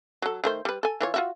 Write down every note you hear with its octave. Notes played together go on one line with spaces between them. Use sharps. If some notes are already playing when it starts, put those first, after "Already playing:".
F#3 A4
D#3 A3 C5
G3 B4
A4 G#5
E3 F4 C#5
F4 F#4 E5